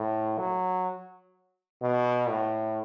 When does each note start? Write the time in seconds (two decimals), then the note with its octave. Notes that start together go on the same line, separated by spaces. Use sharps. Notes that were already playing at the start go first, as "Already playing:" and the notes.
Already playing: A2
0.38 F#3
1.82 B2
2.29 A2